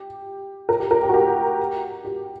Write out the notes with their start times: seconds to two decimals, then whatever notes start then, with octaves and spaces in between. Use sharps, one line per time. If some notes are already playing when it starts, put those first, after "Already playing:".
Already playing: G4
0.69 A#4
0.80 G4
0.91 A#4
1.03 G4
1.09 F#4
1.14 G4
2.04 G4